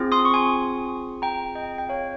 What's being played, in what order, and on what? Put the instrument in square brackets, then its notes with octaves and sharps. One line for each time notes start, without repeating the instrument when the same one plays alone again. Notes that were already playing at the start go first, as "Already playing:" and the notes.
Already playing: [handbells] C4 F4 G#4
C6 D#6
C#6
G#5 C6
G5 A#5
D#5 G5
G5
C#5 F5